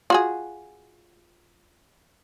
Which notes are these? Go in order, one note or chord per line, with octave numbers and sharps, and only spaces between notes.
F4 F#4 G#4